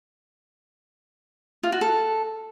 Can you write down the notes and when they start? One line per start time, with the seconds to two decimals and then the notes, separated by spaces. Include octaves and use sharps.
1.63 F4
1.72 F#4
1.81 A4